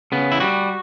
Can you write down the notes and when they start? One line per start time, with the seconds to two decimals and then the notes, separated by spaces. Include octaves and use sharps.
0.12 C#3 B3
0.32 E4
0.40 G3 F#4